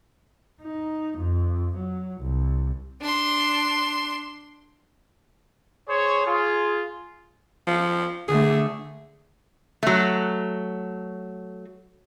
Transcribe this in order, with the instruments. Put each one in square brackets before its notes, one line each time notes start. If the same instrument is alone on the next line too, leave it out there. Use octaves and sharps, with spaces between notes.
[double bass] D#4
F2
F#3
C2
[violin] D4 C6
[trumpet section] G#4 C5 C#5
F4 G#4
[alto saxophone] F3
[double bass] D3 A3 [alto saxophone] G#4
[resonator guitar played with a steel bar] F#3 A3